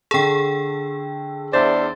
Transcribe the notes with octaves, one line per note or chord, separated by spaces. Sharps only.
D3 G#4 A4 G5
E2 D4 C5 D5 E5 A6